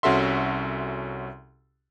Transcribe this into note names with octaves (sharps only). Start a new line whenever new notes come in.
C2 C#4 F#4 A4 E5 C6